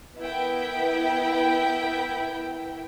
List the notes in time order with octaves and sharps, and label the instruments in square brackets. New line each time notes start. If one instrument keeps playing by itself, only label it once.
[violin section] B3 E4 A#4 G5